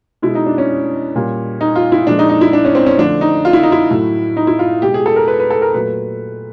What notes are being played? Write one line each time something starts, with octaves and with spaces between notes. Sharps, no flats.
B2 G#3 E4
D#4
D4
C#4
A#2 G3
D#4
F4
E4
A#2 F3 G#3 D4
D#4
D#4
E4
D4
C#4
C4
C#4
D3 F3 A3 D4
D#4
F4
E4
D#4
E4
A2 F#3 A3
D#4
E4
F4
B2 G#3 G4
G#4
A4
A#4
B4
B4
A4
A#4
A#2 F#3 A3 B4